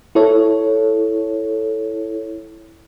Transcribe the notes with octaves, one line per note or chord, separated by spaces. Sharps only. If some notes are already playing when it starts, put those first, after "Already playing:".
E4 A4 C#5